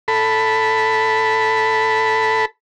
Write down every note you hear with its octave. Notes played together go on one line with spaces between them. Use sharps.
A4 B5